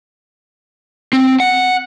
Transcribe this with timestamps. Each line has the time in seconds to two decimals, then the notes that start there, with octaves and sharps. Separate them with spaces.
1.13 C4
1.40 F#5